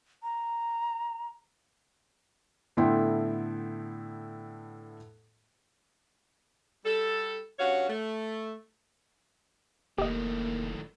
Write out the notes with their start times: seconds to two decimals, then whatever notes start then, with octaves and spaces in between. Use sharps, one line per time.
0.23 A#5
2.77 A2 D3 B3 E4 G5 C6
6.85 G3 A4
7.59 G2 C#4 F#4 C#5 F5
7.89 A3
9.98 F1 A2 D#3 A#3 G4 D#5